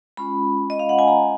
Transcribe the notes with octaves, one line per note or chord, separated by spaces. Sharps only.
G#3 C#4 F4 B5
D#5
F5
F#5
G#5
A#5